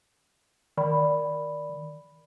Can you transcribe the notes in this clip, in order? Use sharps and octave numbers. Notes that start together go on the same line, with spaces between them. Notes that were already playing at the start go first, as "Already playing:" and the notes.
D#3 D5 B5